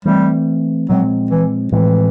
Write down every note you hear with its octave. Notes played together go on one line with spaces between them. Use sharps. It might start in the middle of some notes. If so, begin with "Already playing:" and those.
E3 G3 A3 C4
A#2 F3 F#3 G#3 C4
E3
A2 E3 F3 G#3 C4